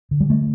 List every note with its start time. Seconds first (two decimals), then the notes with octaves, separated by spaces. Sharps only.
0.11 D3
0.20 G3
0.30 A3